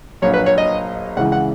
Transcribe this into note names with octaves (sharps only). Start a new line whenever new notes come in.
A#1 A#2 F#3 C#5
B4
C#5
D#5
C#2 C#3 E3 F#5
F#5